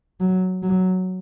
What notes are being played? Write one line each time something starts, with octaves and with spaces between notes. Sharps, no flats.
F#3
F#3